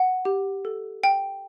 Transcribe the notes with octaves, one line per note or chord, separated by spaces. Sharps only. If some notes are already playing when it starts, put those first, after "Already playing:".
Already playing: F#5
G4
A4
G5